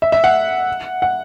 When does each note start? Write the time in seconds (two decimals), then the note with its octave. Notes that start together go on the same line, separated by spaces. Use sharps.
0.02 E5
0.12 E5
0.24 F#5
1.02 F#5